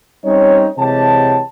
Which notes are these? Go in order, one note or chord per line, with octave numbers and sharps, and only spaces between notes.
G3 C4 C#4 D#4 C#5
C3 E3 G#3 G4 C#5 A5